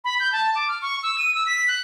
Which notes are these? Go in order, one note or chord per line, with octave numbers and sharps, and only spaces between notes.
B5
G6
A5
D6
F6
C#6
E6
D#7
E6
B6
F#6